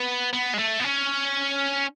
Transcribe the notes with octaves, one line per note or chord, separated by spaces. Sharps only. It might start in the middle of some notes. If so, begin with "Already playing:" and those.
Already playing: B3
B3
G#3
A3
B3
C#4